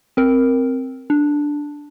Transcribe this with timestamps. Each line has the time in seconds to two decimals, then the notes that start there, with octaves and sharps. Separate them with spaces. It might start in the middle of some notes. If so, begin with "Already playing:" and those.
0.17 C4 A#4
1.10 D4